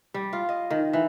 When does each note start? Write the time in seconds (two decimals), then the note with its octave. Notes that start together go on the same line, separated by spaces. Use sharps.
0.14 G3
0.33 F4
0.49 D#5
0.70 D#3
0.93 E3